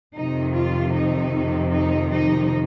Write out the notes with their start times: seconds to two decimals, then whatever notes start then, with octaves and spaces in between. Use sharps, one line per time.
0.15 F2 C3 D#3 D#4
0.54 F4
0.93 D#4
1.72 D#4
2.11 D#4